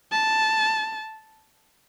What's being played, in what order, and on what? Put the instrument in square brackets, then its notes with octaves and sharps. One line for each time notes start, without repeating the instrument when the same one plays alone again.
[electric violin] A5